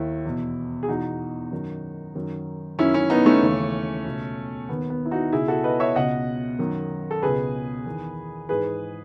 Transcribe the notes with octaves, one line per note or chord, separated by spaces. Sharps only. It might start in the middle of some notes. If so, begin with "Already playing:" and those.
Already playing: D#2 D#3 E4
E2 B2
G#4
E2 B2 D#4 F#4
F#2 D#3
F#2 D#3
F#2 D#3 C#4 E4
C#4 E4
B3 D#4
A3 C#4
D#2 C#3 E3
C#2 B2
D#2 D#3 B3
B3
E4
D#4 F#4
C#2 B2 E4 G#4
F#4 A4
B4 D#5
C#5 E5
C#2 B2 D#5 F#5
F#2 D#3
A4
C#2 B2 G#4 B4
E2 D#3
G#2 E3 G#4 B4